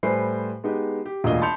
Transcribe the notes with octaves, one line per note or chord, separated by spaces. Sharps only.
A2 G3 B4 C5 G#5 C7
G#3 B3 D#4 G4
G4
E1 D2 A#3 F4 D#5 G7
A5 B5 C6 G6 C#7 F7